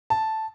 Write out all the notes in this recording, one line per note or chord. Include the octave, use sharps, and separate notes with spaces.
A5